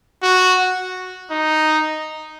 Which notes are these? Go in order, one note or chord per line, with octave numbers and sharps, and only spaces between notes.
F#4
D#4